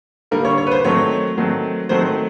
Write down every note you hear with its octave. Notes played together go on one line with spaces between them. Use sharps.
D3 G3 A#3 A#4
C#5
C#5
B4
C5
D#3 F#3 A3 C4 C#5
D#3 F#3 A3 C4
D#3 F#3 A3 C4 C5